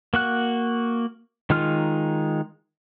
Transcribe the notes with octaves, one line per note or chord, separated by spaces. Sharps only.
A#3 F#4 F#6
D#3 G#3 D#4 F4 F6